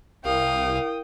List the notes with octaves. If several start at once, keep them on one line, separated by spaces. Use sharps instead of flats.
C2 E4 A#4 F5 G5 D#6